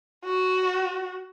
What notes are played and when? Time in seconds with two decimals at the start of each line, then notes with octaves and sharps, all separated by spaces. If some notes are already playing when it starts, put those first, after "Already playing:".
0.25 F#4